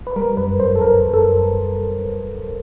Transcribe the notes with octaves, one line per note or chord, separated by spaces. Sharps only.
B4
G3 A#4
F#2 B4
F#2 C5
A4
F#2 A#4
F#2
A4